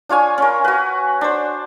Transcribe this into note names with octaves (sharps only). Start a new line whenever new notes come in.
D4 F4 C#5 G#5
C#4 A#4
F#4 B4
D4 C5